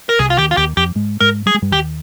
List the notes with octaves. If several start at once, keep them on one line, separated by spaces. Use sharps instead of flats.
A#4
C2 C3 G#4
F4
D#2 D#3 G4
F4
D#2 D#3 G4
F2 F3 G4
G#2 G#3
G#2 G#3 A#4
G3 G#4
G#3
G2 G3
D#2 D#3 G4